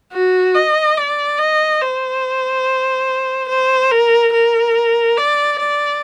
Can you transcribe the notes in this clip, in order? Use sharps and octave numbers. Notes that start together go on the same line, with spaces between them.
F#4
D#5
D5
D#5
C5
C5
A#4
A#4
D5
D5